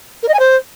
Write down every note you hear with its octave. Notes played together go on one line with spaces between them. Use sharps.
A#4
D#5
G#5
C5